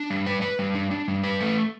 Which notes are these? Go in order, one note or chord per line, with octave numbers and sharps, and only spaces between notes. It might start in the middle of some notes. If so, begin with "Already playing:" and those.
Already playing: D4
G3
B4
B4
G3
D4
D4
G3
B4
A3